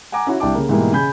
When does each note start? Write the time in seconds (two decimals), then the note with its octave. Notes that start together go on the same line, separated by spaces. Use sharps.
0.12 F#5 G#5 A#5 D6
0.27 C#4 E4 F#4
0.40 C2 D4 E4 G5 A5 D6
0.55 C#3 A#3
0.69 G#2 B2 E3 G3 G#3 A#3
0.92 C#3 G#5 B5 G6